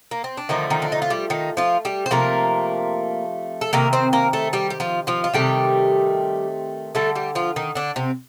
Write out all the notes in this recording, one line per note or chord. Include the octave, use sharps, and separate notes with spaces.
A#3
C4
D4
D3 D#3 F3 A3 D#4
D#3 D#4
D4
D#4
F4
G3 G4
D#3 D#4
F3 F4
G3 G4
C5
C3 F3 A3 A#3 A#4
A4
C3 D#3 A#3 A#4
C4 C5
A#3 A#4
A3 A4
G3 G4
G4
F3 F4
F3 F4
F4
C3 D#3 G3 A3 G4
D3 G3 A3 A4
G3 G4
F3 F4
D#3 D#4
D3 D4
C3 C4